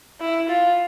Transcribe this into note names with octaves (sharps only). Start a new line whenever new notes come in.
E4
F4